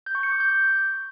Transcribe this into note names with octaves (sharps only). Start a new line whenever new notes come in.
G6
C#6
C#7
D6
G6